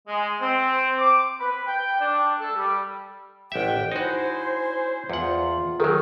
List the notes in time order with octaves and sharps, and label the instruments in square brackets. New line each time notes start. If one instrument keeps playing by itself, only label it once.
[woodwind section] G#3
C4
D6
B4
G5
D4
A4
G3
[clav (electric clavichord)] A1 E5 [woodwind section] G4 F#5 G5
[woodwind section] C#4 E4 C5 [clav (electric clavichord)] D#4 F#4
[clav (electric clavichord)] E2 F#5 [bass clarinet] F4
[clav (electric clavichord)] D#3 F#3 [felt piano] G#4 A#4